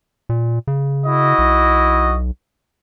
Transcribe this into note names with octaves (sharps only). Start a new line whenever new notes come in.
A#2
C#3
E4 F#4 D#5
B1